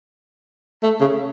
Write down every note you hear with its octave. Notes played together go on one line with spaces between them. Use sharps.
A3
C#3